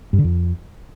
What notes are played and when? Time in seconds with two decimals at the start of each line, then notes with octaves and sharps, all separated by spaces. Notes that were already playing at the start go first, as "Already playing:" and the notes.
0.13 G2
0.19 D3
0.24 F2